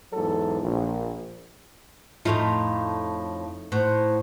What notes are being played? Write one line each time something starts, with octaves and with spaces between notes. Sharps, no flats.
E2 G#2 F#3 A4
A#1
F2 A2 A3 D#4 F4 F5
A2 C5 F#5